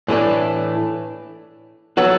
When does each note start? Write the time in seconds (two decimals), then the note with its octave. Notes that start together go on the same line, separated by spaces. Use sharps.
0.08 A2 E3 A3 D4
1.97 F#3 B3 F#4 A4